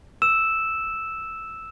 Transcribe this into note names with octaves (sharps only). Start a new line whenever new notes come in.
E6 E7